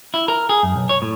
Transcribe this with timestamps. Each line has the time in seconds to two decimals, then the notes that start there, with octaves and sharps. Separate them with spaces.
0.14 E4
0.28 A#4
0.49 G#4
0.63 F#2
0.76 B1
0.89 C#5
1.02 A2